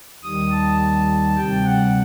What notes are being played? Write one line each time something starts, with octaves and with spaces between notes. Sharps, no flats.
D#2 D#3 G3 D#6
A5
D2 C3 G3 G5
F#5